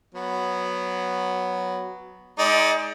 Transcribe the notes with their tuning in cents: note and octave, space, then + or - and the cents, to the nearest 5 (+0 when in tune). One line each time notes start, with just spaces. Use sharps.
F#3 +0 B3 +0
G#3 +0 D#4 +30 D5 +10